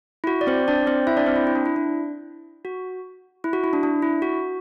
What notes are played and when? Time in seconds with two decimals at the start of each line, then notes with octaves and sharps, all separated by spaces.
0.24 E4
0.27 F#4
0.41 D5
0.47 C4 C5
0.68 D4 D5
0.87 C4 C5
1.07 E4 E5
1.17 D4 D5
1.26 C4 C5
1.36 E4
1.47 E4
1.56 D4
1.66 E4
1.76 D4
2.65 F#4
3.44 E4
3.53 F#4
3.64 E4
3.73 D4
3.83 D4
4.02 E4
4.22 F#4